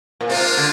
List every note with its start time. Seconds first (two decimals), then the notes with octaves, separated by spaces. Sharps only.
0.21 A#2
0.29 C3 G#3 D4 F4
0.57 D3